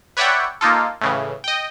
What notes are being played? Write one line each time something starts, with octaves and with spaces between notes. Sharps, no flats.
B4 C#5 D5 E5 F#5 G5
A#3 D#4 F4 A4
A2 C#3 E3
D#5 G5